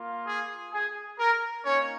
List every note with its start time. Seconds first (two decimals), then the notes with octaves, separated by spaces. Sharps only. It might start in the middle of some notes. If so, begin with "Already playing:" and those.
Already playing: A#3 F4
0.26 G#4
0.72 G#4
1.19 A#4
1.64 A#3 C#4 D#4 C#5